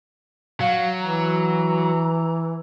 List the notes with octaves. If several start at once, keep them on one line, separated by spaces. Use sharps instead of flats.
F#3 F5
E3 A#5